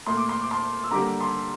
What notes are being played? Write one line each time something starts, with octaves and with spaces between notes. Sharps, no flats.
A#2 A3 C6
D6
C6
D6
A5 C6
E6
D3 G3 A#3 A#5 D6
A5 C6